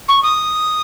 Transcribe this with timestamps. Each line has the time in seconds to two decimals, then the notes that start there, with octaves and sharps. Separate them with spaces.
0.08 C#6
0.23 D#6